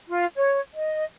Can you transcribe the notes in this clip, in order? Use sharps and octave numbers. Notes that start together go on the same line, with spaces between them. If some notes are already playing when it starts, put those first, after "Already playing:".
F4
C#5
D#5